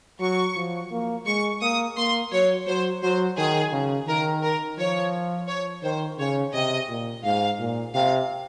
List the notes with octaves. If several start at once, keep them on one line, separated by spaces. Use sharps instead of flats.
F#3 C#6
F3
A#3
G#3 C#6
A#3 D#6
A#3 C6
F#3 C#5
F#3 C5
F#3 C5
D#3 G#4
C#3
D#3 A#4
A#4
F3 C#5
C#5
D#3 C5
C#3 C#5
C3 D#5
A#2
G#2 F5
A#2
C3 F5